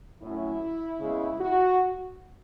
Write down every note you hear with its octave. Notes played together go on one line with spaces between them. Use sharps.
A2 F#3 C#4 E4
C#3 G#3 B3
F#4